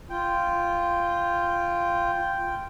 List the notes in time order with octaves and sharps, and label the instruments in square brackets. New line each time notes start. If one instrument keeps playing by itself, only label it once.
[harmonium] F4 [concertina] G5